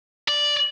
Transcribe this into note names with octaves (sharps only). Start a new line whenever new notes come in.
D5